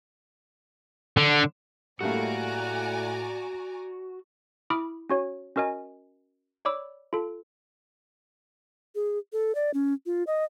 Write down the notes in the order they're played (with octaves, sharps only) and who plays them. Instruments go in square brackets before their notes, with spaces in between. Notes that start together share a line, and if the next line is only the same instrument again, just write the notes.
[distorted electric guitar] D3
[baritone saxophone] A2 [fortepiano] G3 A3 A#3 [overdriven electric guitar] F#4 [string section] D5 G#5 A#5
[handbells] E4 B5 D6 D#6 F6 D7
C#4 F#4 C#5
C#4 F#4 A#4 D#5 G#5
C#5 D5 B5 D6 E6
F4 A4
[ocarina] G#4
A4
D5
C#4
F4
D#5